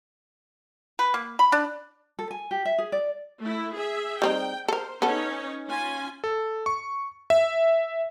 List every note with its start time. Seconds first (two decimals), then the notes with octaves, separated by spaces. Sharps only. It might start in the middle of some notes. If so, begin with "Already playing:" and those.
0.99 B4
1.14 A#3
1.39 B5
1.52 D4
2.19 A4
2.31 G#5
2.51 G4
2.65 E5
2.78 G#4
2.92 D5
3.40 A3 E4
3.74 G#4 E5
4.22 G3 C4 D#4 G5
4.68 A4 A#4 C5
5.02 B3 C#4 D#4 A4 C#5
5.66 C#4 F4 G#5
6.24 A4
6.66 C#6
7.30 E5